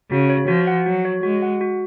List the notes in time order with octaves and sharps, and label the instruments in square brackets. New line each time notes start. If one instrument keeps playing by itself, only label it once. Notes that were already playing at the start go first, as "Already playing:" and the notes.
[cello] C#3 [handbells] F#4
[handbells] C#5
[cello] F3 [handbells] F#4
[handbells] F#5
[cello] F#3 [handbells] F#4
[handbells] C#5
[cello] G#3 [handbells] F#4
[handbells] F#5
F#4